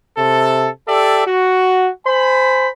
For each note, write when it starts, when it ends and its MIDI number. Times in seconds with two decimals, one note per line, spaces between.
0.17 0.68 48
0.17 0.68 69
0.88 1.24 67
0.88 1.24 69
0.88 1.24 74
0.88 1.24 76
1.26 1.89 66
2.06 2.67 72
2.06 2.67 80
2.06 2.67 83